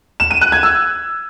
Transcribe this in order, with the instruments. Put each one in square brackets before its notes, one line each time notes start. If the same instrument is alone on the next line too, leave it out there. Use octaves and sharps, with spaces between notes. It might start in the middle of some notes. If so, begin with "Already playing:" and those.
[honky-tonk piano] E7
D#7
F#6
G#6
E6